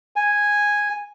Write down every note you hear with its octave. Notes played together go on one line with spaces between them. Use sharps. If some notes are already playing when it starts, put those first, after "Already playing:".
G#5